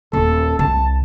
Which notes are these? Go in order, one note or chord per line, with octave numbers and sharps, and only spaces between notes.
D#1 A4
C2 A5